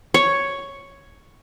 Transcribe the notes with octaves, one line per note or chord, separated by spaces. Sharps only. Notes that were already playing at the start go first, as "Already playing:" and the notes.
C#5